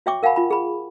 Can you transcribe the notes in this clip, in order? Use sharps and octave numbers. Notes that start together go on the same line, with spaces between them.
F#4 C#5 E5 G5 C#6 D6
A#4 F5 F#5 G#5 B5
F4 B5
G#4 B5